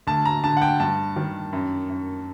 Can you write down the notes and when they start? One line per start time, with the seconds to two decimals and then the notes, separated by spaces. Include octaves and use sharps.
0.07 D2 A5
0.25 A#5
0.43 D3 A5
0.57 F#5
0.62 G5
0.80 G2 A5
1.16 D#3
1.53 F#2
1.89 F#2